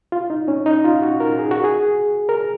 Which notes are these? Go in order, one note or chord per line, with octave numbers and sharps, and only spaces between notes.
F4
D#4
C#4
D#4
F4
F#4
A#4
G#4
F#4
G#4
A#4